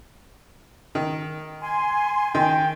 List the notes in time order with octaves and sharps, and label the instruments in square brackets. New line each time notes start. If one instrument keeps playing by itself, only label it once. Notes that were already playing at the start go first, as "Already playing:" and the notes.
[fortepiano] D#3
[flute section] G#5 C6
[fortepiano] D#3 [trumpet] G5